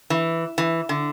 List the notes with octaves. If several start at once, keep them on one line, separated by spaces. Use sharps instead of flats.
E3
E3
D3